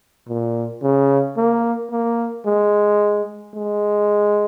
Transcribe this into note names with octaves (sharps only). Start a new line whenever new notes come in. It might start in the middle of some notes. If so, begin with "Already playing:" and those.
A#2
C#3
A#3
A#3
G#3
G#3